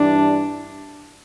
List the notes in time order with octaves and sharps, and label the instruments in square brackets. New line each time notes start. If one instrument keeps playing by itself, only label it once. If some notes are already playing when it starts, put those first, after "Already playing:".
Already playing: [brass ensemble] G2 E3 G3 D4